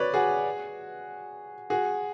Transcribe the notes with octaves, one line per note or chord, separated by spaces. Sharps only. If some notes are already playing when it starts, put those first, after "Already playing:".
Already playing: B4 C#5 D5
F#4 G#4
F#4 G#4